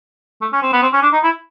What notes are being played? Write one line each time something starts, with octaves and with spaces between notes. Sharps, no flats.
A3
C#4
C4
B3
C4
C#4
D4
D#4
E4